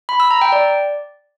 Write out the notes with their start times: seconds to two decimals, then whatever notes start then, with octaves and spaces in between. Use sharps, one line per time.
0.09 B5
0.20 E6
0.31 A#5
0.42 G5
0.52 D5